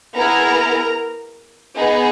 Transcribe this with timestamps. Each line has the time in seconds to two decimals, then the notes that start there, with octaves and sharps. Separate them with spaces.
0.16 B3 E4 G#4 A#4 A#5
1.76 B3 D#4 G#4